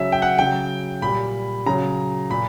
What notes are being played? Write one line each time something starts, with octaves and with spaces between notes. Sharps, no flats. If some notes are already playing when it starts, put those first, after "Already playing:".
Already playing: C#3 F#3 E5
G5
F#5
C#3 F#3 G5
A#2 G3 B5
C#3 F#3 A#5
A#2 B5